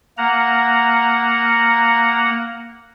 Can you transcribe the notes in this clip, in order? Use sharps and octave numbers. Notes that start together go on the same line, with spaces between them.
A#3 F#5 A#5